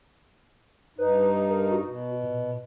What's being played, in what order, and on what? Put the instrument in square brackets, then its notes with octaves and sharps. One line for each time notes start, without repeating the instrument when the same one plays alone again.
[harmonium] G2 D#4 [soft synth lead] B4
[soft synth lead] A#4
F#4
[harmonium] B2
[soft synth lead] A#2